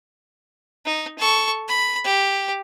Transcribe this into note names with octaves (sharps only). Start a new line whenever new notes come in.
D#4
A4 C#6
B5
G4